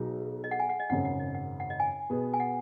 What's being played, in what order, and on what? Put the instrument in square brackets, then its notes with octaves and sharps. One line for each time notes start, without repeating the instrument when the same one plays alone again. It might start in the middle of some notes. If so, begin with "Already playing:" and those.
Already playing: [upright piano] B1 B2 F#3 D#4 [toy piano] G#4
[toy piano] D#5
F#5
G#5
F#5
D#5
[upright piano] G#1 F#2 C#3 [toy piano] F#5
[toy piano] F#5
D#5
F#5
F#5
D#5
G#5
[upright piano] B2 B3 G#4
[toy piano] G#5
F#5